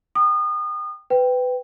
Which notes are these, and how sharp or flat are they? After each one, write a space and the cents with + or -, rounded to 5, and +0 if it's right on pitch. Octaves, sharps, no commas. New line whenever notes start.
G5 +0 D#6 -30
B4 +20 G5 +0